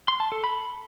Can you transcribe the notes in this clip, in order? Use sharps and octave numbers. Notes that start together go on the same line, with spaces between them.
C6
A5
A4
B5